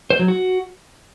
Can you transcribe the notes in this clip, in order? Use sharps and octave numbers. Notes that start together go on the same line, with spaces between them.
C5
F#3
F#4